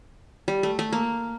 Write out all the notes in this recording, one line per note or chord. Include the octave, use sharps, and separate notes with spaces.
G3
A3
A3
A#3